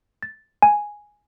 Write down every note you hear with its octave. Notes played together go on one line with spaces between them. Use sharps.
A6
G#5